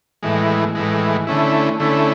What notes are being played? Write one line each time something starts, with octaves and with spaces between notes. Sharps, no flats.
A2 E3 G#3
A2 E3 G#3
D3 A3 C#4 E4
D3 A3 C#4 E4